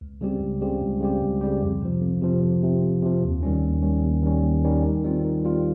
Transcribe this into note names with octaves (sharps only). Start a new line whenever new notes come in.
C#2
C#3 G3 C4 G4
C#2
C#3 G3 C4 G4
C#2
C#3 G3 C4 G4
C#2
C#3 G3 C4 G4
F2
C3 F3
F2
C3 F3
F2
C3 F3
F2
C3 F3
D#2
D#3 G3 C#4
D#2
D#3 G3 C#4
D#2
D#3 G3 C#4
D#2
D#3 G3 C#4
D#3
G3 C4 F4
D#3
G3 C4 F4